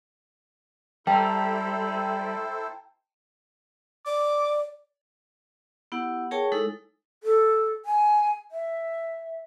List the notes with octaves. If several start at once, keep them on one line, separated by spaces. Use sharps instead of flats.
G3 E4 A4 C5 G5 A5 A#5
D5 D6
B3 E4 G4 F#5
G#4 A#4 C#5 G5 A5 C#6
G#3 D#4 E4 A4
A4
G#5
E5